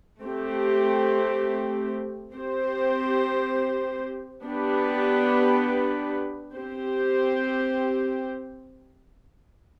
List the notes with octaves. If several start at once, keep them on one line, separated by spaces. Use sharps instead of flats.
A3 C4 G4
C4 G4 C5
B3 D4 G4 B4
C4 G4 C5